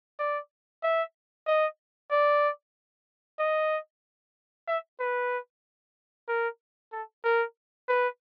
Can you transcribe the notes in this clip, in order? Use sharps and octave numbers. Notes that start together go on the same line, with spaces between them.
D5
E5
D#5
D5
D#5
E5
B4
A#4
A4
A#4
B4